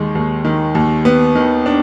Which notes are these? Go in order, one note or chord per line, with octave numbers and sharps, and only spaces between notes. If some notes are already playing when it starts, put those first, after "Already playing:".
Already playing: D#2 D#3 G#3
D#2
D#3
D#2
B3
D#3
D4